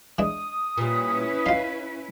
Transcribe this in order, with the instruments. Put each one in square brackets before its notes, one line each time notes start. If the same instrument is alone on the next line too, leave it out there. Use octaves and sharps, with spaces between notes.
[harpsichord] E3 G#3 D4 [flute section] D#6
[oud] A#2 G3 [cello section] C#4 E4 B4
[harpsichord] D#4 F4 [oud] F5